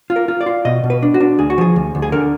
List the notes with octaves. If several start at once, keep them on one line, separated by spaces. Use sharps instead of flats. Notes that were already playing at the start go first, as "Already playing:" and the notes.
F4
A#4
F4
D5
F4
B2 D#5
B2
B4
D4
F#4
D4
D2 G#4
F#4
F3 G#4
D2
D2
G#4
D3 A#4